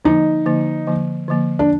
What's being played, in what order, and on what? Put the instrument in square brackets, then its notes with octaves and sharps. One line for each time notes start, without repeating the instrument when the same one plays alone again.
[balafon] D3 F3 A#3 [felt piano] D#4
[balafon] D3 F3 A#3
D3 F3 A#3
D3 F3 A#3
[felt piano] D4